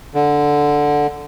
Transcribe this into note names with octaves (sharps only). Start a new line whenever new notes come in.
D3